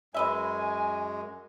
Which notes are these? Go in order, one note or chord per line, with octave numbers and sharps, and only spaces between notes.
F#2 G#3 B4 D#5 E5 G#5